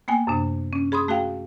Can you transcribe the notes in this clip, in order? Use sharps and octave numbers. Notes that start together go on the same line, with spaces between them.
A#3 B3 G5 G#5
F#2 C3 D4
C#4
G#4 B5 C6 D#6
A3 F#4 G#4 F5 G5